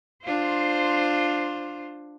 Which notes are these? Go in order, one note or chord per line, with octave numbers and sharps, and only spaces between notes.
D4 F4 C5